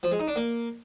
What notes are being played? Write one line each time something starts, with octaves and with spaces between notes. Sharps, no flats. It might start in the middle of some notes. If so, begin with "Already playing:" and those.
F3
G#3
D#4
D4
A#3